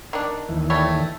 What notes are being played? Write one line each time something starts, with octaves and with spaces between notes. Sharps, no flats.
D#3 D4
D#2 E3
G3 A3 C#5